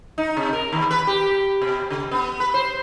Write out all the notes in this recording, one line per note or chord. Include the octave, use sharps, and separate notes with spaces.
D#4
C3
A#4
D#2
B4
G4
B2
C#3
B3
B4
C5